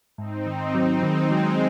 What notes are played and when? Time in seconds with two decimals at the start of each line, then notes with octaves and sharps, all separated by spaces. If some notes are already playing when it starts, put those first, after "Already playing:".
0.18 G#2 C4 D#4
0.46 D#3
0.75 F#3
1.03 D#3 G#3 C4
1.31 F#3